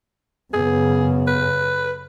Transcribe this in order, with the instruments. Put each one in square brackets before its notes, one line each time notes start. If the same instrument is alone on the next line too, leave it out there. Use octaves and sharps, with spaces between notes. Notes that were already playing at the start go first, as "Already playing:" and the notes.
[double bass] F#2 C#3 [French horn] B3 [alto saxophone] G#4
[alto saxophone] B4